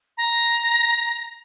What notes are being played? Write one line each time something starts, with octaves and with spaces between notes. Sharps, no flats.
A#5